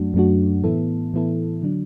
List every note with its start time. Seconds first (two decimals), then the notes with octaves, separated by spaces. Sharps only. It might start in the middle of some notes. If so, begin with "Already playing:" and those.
Already playing: F#2 F#3 A3 D4 F#4
0.14 F#2 F#3 A3 D4 F#4
0.63 A2 E3 B3 E4 A4
1.14 A2 E3 B3 E4 A4
1.62 D3 F#3 D4